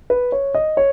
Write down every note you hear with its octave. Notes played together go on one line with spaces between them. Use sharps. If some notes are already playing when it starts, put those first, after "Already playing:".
B4
C#5
D#5
C#5